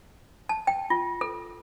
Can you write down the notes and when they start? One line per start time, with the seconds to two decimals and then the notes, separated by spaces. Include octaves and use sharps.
0.49 A5
0.67 G5
0.90 F4
1.21 A4